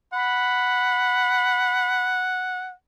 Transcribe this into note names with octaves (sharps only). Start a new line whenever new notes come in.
F#5 B5